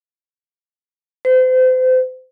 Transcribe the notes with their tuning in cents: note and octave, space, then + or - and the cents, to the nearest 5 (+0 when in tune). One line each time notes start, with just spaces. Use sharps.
C5 -35